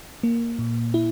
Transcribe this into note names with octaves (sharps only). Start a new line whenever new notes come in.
A#3
A#2
E4